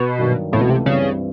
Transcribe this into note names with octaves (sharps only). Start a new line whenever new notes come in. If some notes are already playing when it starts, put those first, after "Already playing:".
Already playing: B2
G2 D#3 F#3
C#2 A2 C3 E3 A3
B2
C3
G2 C#3 E3 G3 C4